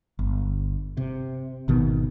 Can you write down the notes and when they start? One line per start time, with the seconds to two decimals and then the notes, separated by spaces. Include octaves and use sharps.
0.19 G1
0.97 C3
1.68 G#1 B2 D#3 B3